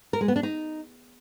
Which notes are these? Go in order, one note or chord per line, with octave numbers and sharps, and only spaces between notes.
A#4
G#3
B3
D4
D#4